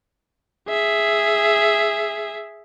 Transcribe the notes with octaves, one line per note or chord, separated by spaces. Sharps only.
G#4 E5